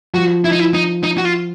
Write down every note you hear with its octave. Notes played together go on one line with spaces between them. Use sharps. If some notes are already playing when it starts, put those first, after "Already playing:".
F3 F#4
E4
D#4
E4
D#4
D#4
F#4
F4